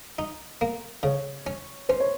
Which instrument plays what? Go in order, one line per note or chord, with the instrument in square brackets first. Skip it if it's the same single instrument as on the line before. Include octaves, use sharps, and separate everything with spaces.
[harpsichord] D#4
A#3
[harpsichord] C#3 [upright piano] C#5
[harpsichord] C#4
[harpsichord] C#4 [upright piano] C5
[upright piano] C#5